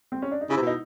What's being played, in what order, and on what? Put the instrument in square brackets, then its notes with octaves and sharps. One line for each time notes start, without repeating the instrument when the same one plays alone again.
[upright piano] C4
C#4
D4
D#4
[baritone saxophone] C#3 [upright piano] E4
[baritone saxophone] C3
B2
[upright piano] D#4